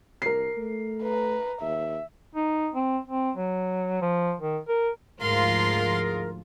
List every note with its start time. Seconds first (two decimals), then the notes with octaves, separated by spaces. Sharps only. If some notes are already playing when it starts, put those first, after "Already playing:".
0.22 C2 A#4 C7
0.57 A3
1.02 B4 A#5
1.61 D#2 E5
2.35 D#4
2.74 C4
3.08 C4
3.36 F#3
4.02 F3
4.40 D#3
4.68 A#4
5.21 D2 G#2 F3 F4 G#4 A#4 F5 C6